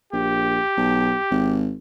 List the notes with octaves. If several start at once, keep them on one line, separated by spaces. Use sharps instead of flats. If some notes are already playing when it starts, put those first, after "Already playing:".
A#1 G4
B1
G#1